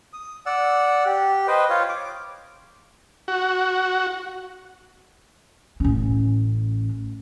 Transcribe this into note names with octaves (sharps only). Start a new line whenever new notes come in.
D#6
D5 F#5 E6
G4
B4 C5 D#5 G5
F4 C#5 F5
D6
F#4
A1 C#4